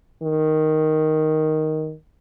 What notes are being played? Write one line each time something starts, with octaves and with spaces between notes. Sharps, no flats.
D#3